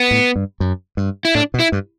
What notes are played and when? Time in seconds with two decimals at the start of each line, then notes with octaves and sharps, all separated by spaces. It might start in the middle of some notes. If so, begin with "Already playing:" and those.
Already playing: B3
0.11 A2
0.36 G2
0.60 F#2
0.97 G2
1.25 E4
1.35 A2 D4
1.54 B2
1.60 E4
1.72 G2